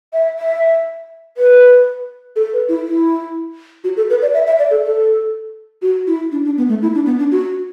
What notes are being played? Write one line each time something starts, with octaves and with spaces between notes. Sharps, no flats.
E5
E5
B4
A4
B4
E4
E4
F#4
A4
B4
D5
E5
E5
D5
A4
A4
F#4
E4
D4
D4
B3
A3
E4
D4
B3
D4
F#4